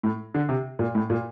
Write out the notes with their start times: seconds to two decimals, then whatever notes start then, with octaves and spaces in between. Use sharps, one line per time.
0.03 A2
0.34 D3
0.49 C3
0.79 A#2
0.95 A2
1.10 A#2